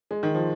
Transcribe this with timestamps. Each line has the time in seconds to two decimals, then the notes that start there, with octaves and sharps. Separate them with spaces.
0.11 G#3
0.23 D#3
0.35 F3